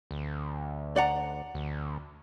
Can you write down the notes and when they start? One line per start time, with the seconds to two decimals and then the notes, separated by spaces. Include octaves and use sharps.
0.11 D2
0.96 D5 F#5 A#5
1.55 D2